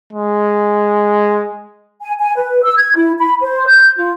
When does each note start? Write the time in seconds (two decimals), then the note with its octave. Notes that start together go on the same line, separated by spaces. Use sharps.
0.13 G#3
2.01 G#5
2.19 G#5
2.36 B4
2.64 E6
2.77 G#6
2.95 E4
3.18 B5
3.41 C5
3.67 G6
3.97 F4